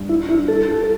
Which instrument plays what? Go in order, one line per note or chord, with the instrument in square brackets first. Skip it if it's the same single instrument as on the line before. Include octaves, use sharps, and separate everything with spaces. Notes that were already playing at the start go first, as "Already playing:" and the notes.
Already playing: [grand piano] G2
[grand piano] G3 [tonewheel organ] E4
[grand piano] D4 [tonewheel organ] E4
[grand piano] G3 [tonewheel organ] A4
[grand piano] F4